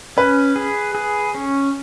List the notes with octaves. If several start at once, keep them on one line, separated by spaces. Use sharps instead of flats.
C#4 B4
G#4
G#4
C#4